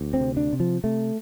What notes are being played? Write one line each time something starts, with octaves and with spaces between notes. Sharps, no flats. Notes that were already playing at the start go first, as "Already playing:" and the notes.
Already playing: D2
C4
C3
D4
C3
F3
C3 A3